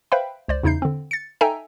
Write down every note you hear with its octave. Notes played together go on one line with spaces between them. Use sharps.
B4 C5 E5 F5 G5 B5
C#2 C5 D5
E2 C#3 D#4 E4 G6 C7
D3 C4
A6 C#7
D#4 A4 E5 G5 G#5 A#5